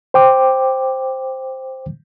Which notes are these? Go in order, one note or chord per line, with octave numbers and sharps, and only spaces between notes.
C5 G5 D6